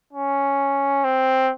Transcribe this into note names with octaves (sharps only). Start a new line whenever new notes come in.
C#4
C4